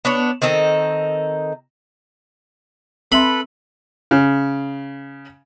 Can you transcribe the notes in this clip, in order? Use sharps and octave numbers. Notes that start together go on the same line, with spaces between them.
B3 D4 C#5
D#3 C4 D#4 A4
C4 A4 B4 E5 B5 C6
C#3